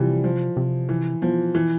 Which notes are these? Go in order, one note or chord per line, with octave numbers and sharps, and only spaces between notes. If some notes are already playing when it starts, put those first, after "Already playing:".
Already playing: C3 E3 F3 G3
F3
C3
E3
B2 F3
E3